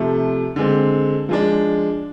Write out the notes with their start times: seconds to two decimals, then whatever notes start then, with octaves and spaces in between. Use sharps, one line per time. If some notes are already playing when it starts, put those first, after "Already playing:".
Already playing: C3 F3 A3
0.56 D3 G#3 C4
1.29 F3 G#3 D4